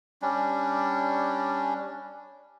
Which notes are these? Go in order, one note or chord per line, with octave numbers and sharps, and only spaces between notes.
G3 C#4 D4